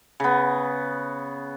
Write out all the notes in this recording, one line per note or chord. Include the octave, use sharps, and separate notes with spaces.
C#3 B3